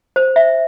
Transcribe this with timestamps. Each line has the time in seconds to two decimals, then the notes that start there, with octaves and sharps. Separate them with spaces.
0.16 C5
0.36 E5